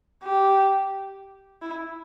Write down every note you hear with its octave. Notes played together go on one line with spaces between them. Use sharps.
G4
E4